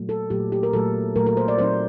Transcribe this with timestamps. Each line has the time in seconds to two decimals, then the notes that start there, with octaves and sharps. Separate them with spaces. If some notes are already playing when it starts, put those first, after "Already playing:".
Already playing: A#2 F#3 A3
0.09 A4
0.30 A#2 F#3 A3 G4
0.52 G4
0.63 A#4
0.73 A#2 F#3 A3 A4
1.16 A#2 F#3 A3 A#4
1.27 A#4
1.37 C5
1.48 D5
1.58 A#2 F#3 C4 D#4 C5